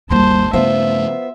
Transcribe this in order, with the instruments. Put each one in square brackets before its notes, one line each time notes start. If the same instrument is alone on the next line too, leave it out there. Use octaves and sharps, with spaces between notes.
[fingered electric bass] G#1 D#2 [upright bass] G3 A#3 [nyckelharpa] C5 A5
[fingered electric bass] G2 C#3 A3 [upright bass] F3 [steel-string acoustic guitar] B3 F4 C5 [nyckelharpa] E5